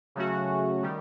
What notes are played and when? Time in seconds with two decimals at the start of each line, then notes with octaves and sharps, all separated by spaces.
0.15 C#3 F#3 A3 C#4 F#4
0.83 D#3 G3